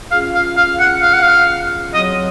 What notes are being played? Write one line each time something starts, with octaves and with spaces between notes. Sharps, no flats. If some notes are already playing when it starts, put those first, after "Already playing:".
C#4 F4 G#4 F5
F5
F5
F#5
F5
F#5
F5
F#3 C4 F#4 C#5 D#5